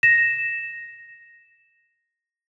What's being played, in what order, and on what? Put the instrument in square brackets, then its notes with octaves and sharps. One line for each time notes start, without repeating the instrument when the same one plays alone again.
[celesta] A#6 E7